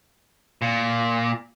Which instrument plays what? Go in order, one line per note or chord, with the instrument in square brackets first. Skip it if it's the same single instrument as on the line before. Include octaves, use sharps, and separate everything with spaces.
[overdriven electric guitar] A#2